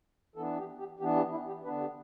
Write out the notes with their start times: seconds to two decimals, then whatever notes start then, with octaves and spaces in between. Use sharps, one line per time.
0.36 E3 B3 D4 A4
0.58 G4
0.78 G4
0.99 E3 B3 D4 G4
1.16 G4
1.31 E4
1.47 G4
1.64 D3 B3 D4 B4
1.80 G4